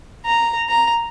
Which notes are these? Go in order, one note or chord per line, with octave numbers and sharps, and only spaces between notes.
A#5
A#5